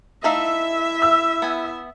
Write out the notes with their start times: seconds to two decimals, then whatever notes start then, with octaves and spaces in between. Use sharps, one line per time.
0.24 A3 D#4 E4 E5 F5
1.02 E6
1.42 B3 G#5